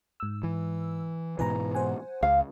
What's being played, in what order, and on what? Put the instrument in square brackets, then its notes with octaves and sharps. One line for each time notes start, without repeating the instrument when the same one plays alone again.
[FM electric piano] G#2 E6
[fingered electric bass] E3
[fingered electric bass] G#2 B2 E3 [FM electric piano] B4 G#5 A#5
[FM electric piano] C5 F#5 G#5
[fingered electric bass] C#2 [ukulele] F5